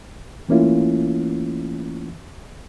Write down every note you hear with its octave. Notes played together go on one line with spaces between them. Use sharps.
E3 A3 A#3 C#4 E4 F4